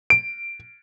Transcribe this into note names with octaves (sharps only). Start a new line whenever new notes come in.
D7